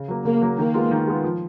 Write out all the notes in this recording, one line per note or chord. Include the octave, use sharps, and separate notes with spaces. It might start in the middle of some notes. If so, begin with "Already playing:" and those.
Already playing: C#3
F#3 A#3
C#3 A#3
F#3 A#3
D#3 A#3
G#3 B3 F4
D#3
G#3 B3 F4
F3